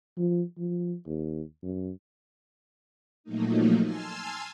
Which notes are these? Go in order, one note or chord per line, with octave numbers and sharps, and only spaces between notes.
F3
F3
D#2
F#2
A#2 F3 F#3 A3 A#3 D#4
G#5 A5 C6 E6 F6 G#6